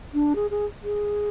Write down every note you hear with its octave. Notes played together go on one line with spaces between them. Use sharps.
D4
G#4
G#4
G#4